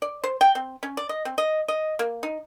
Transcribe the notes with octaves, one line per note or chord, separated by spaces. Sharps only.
D5
C5
G5
C4
C#4
D5
D#5
C4
D#5
D#5
A#3
D#4